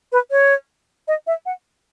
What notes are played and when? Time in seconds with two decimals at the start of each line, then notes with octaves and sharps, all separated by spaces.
0.12 B4
0.31 C#5
1.08 D#5
1.27 E5
1.46 F#5